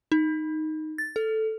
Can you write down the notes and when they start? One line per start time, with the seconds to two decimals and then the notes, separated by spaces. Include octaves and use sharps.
0.12 D#4
0.98 A6
1.16 A4